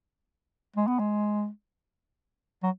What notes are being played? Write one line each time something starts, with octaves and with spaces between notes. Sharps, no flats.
G#3
B3
G#3
F#3